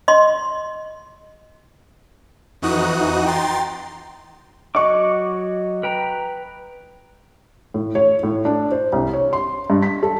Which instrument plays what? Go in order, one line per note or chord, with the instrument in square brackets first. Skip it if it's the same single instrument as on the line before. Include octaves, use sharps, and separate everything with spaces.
[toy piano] D#5 C6
[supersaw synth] F2 E3 D#4 F#4 D#6 F#6
G5 A#5 C6 A6
[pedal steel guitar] F#3 F#5 D6 [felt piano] D#5 C#6
[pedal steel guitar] B4 G5 A#5
[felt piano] A2
C#5
A2
D4
C5
C2
C#5
C6
G2
B6
A4